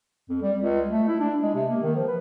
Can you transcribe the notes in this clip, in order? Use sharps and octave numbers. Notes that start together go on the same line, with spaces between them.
F2
G3
C#2
A3
E4
D4
G#3
C3
A#3
D#3
F3
B4